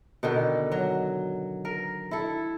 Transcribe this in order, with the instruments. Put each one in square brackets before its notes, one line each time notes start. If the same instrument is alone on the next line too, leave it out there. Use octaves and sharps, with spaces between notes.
[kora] B2 D3 D#3
F#3
A#4
E4 A4